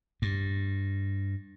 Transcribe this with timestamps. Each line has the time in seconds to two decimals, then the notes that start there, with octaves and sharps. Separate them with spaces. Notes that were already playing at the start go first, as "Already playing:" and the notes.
0.22 G2